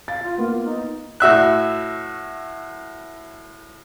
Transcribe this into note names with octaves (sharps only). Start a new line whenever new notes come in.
F5 A6
F4
A#3 B3
F4
D#4
A2 F#4 E5 F#6